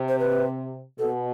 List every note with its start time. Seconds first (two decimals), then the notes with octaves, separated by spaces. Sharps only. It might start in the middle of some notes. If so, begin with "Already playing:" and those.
Already playing: C3
0.09 C5
0.19 B4
0.99 B2 A4